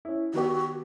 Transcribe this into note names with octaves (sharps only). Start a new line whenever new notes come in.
C#4 E4
D#3 B3 F#4 G4